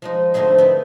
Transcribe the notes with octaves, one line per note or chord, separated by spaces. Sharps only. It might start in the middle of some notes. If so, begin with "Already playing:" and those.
F3 G#3 D#4
D3 F3 A3 C4 D#4 G#4
B3 D#4 E4